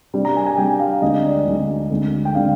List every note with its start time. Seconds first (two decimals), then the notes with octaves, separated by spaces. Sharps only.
0.14 C3 G3 D4
0.25 A#5
0.36 G#5
0.47 G#5
0.57 C3 G3 D4 G5
0.80 F5
1.02 D2 D3 G#3 D4 D#5
1.24 D5
1.47 D2 D3 G#3 D4
1.91 D2 D3 G#3 D4
2.25 G5
2.35 D3 G#3 D4 F5